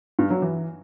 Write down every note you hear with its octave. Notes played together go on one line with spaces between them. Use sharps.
G2
F#3
E3